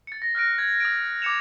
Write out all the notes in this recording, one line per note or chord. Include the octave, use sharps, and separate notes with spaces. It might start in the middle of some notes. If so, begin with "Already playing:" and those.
A6 C#7
A#6
F6 F#6 A#6 D7
G#6
D#6 A6 D7
D6 G#6 C#7 E7 F7